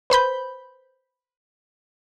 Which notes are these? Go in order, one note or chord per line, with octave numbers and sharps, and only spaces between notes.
B4 C5 B5 G6